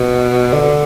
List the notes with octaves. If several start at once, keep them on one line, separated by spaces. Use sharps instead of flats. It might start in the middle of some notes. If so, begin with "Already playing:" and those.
Already playing: B2
D3